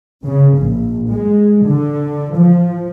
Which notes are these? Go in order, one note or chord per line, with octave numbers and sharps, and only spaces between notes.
C#3
A#1
G#3
D3
F3